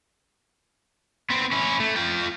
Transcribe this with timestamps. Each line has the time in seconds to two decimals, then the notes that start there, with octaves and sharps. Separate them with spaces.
1.30 B3 C4
1.52 C#4 E4
1.80 A3
1.96 F4 G5